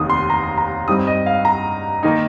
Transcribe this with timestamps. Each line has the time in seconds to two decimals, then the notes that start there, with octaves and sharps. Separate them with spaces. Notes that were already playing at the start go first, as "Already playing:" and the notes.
Already playing: F1 D#2 D#3 D#6
0.10 C6
0.30 A#5
0.43 C6
0.58 A#5
0.88 G2 G3 C4 D#4 D#6
1.07 D#5
1.26 F5
1.45 A#5
2.03 D#3 A#3 D#4